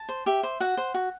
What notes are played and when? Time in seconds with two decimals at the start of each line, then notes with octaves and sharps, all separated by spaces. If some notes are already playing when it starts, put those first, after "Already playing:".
Already playing: A5
0.09 C5
0.26 G4 E5
0.43 C5
0.60 F#4 F#5
0.77 C5
0.94 F#4